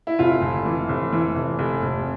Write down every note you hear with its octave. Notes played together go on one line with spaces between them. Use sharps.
E4
F1 F4
F1
E3
F1
E3
F1
F1
F1